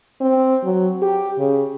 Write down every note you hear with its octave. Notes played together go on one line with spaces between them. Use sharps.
C4
F#3
G4
C#3